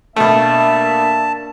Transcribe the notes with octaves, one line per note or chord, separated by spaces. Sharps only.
B2 A3 A#3 D4 E5 A5